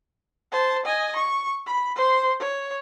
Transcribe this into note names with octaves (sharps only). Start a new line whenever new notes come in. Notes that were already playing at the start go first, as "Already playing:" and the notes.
C5 A5
D#5 G#5
C#6
B5
C5 C6
C#5